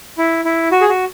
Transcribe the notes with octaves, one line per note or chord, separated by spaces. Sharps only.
E4
E4
F#4
G#4
F#4